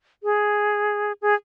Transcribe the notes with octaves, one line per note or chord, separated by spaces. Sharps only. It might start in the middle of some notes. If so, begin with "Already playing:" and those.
G#4
G#4